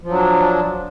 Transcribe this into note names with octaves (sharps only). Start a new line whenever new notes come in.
F3 F#3 D4